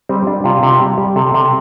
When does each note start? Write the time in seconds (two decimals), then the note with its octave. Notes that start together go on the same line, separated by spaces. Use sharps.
0.09 G3 C4
0.27 G3 D4
0.44 C3 F4
0.63 C3
0.80 G3 G4
0.98 G3
1.16 C3 A4
1.34 C3